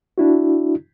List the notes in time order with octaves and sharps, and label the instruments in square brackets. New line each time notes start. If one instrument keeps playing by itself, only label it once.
[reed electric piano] D4 E4 F#4